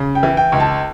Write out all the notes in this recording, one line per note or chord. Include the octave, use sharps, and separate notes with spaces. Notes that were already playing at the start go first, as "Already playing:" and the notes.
Already playing: C#3
G5
E3
G5
C#2
A5